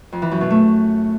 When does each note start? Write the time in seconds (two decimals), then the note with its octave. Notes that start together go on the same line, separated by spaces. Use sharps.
0.12 F2
0.22 E3
0.31 F#2
0.41 B2
0.50 A3